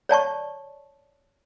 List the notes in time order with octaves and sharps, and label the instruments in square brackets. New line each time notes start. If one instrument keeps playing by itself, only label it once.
[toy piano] C#5 D5 A5 C#6